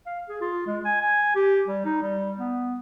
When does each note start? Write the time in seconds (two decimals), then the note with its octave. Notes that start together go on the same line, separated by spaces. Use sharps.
0.06 F5
0.29 G#4
0.41 F4
0.67 G#3
0.85 G#5
1.01 G#5
1.35 G4
1.68 G3
1.85 D#4
2.02 G3
2.38 B3